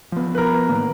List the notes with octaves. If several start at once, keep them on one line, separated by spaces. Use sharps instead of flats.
F3 B3
A#4 B4
A2 D#3 A#3